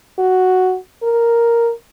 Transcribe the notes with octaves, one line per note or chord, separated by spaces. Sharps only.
F#4
A#4